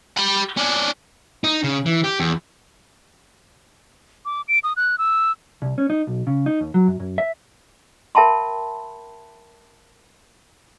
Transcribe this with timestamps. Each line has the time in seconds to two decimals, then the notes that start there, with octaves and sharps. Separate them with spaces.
0.18 G4 B5
0.57 C#4 D4
1.44 D#4
1.64 C#3
1.86 E3
2.04 G4
2.20 E2
4.25 D6
4.48 D7
4.64 D#6
4.77 F#6
4.98 E6
5.62 C2
5.78 C#4
5.90 D#4
6.07 B1
6.27 C#3
6.46 D#4
6.61 D#2
6.74 F#3
6.88 F#2
7.00 F#2
7.18 E5
8.15 A#4 E5 G5 A5 B5 C6